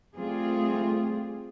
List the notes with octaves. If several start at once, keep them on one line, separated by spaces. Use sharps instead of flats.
G3 A3 C4 F4 G#4